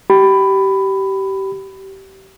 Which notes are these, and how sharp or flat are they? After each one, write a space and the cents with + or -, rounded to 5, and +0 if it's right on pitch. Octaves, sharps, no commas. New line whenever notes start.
G4 -25 B5 +10